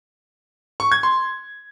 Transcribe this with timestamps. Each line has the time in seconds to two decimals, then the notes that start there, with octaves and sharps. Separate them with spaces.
0.80 C#6
0.92 G#6
1.03 C6